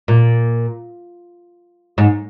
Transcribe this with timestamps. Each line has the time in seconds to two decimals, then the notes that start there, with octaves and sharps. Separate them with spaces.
0.08 A#2
1.98 G#2